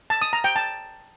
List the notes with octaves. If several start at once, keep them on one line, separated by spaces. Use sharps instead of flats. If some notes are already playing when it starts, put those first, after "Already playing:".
A5
D#6
A#5
G5
A5